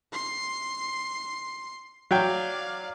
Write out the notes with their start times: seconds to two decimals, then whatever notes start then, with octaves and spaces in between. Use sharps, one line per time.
0.13 C6 C7
2.11 F#3 D5 F5 G5